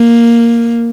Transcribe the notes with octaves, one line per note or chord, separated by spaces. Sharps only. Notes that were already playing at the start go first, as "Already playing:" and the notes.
Already playing: A#3